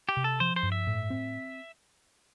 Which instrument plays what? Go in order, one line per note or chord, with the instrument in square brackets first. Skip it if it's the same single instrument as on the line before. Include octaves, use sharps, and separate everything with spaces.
[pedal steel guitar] G4
[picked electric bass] C3
[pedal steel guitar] A4
[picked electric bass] F3 [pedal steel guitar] C5
[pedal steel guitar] C5
[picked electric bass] G2
[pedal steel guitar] E5
[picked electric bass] A2
C4